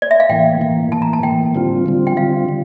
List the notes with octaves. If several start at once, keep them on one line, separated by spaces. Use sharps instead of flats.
D5
E5
F5
A2 E3 A#3 G5
A2 E3 A#3
A2 E3 A#3 A5
A#5
A5
A2 E3 A#3 G5
D3 G3 C4 F4
D3 G3 C4 F4
G5
D3 G3 C4 F4 F5
D3